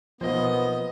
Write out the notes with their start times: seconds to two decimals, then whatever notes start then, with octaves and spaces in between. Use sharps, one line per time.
0.21 B1 F3 A#3 B3 F4 C5 D#5